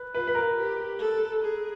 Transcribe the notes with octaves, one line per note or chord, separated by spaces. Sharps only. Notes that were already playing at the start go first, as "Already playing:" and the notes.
Already playing: B4
F4 B4
B4
A#4
G4
A4
G#4